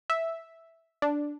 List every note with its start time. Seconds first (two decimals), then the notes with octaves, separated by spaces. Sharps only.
0.10 E5
1.02 D4